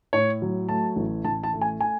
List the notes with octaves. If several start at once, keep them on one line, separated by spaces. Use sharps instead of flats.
A2 C#5
F#3
A3 A5
A1
A1 A5
A5
A3
G#5
G#5